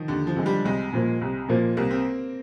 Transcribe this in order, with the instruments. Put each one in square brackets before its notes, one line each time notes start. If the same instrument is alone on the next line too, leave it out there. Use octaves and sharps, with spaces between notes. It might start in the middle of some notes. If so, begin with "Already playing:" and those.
Already playing: [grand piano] D#3 F3
[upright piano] D#2 [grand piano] D3
[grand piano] F3
[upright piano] D3 G#3
[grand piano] G3
[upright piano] C2 [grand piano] G#3
[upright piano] A#2 F3 A#3
C2
A#2 F3 A#3
[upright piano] C2 [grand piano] A#3
[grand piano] C4